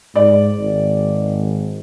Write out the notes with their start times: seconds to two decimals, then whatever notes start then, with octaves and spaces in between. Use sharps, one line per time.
0.15 G#2 D5
0.59 G#1